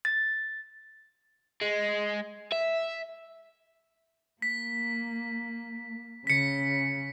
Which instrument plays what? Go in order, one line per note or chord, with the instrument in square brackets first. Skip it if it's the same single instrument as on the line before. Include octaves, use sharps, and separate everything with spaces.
[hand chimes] A6
[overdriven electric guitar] G#3
E5
[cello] A#3 [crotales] B6
[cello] C#3 [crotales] B6 C#7